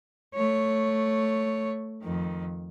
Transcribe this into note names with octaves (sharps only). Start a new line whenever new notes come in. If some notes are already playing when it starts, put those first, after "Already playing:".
A3 C#5
F2 D#3